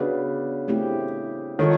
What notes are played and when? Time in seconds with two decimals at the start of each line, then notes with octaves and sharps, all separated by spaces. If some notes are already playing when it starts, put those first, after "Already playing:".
Already playing: C#3 B3 D4 F#4 B4 D5
0.68 A3 C4 E4 G4
1.59 D#3 F4 A4 C#5